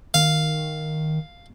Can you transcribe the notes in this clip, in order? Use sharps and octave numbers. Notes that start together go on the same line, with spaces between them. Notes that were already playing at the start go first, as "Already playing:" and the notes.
D#3 F5